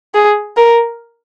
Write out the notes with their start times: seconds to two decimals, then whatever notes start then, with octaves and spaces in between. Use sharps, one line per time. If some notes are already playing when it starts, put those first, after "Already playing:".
0.15 G#4
0.57 A#4